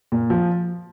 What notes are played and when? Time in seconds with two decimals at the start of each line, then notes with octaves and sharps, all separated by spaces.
0.12 A#2
0.30 F3